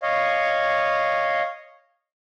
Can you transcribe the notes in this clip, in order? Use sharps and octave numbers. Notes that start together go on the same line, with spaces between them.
C#5 D#5 F5